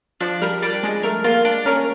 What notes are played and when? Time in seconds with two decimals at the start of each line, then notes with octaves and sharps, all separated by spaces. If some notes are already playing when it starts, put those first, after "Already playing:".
0.20 F3 D4
0.42 G3 A#4
0.62 G3 D4
0.83 G#3 D4
1.03 A3 A#4
1.24 A#3 F4
1.45 D4
1.66 C#4 A#4